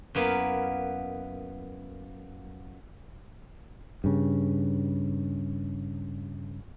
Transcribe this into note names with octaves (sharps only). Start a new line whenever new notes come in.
F#2 A#3 B3 E4 F5
G2 C#3